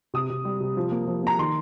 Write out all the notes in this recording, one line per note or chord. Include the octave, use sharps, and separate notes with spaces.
C3 D#6
C3
G3
C3
F3
A#3
F3
A#3 A#5
D#3 C6